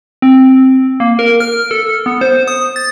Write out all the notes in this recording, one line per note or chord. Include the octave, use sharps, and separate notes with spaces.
C4
A#3
A#4
F6
A4
B3
C5
D#6
A6